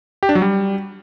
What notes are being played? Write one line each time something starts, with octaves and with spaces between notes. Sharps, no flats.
G4
D4
F#3
G3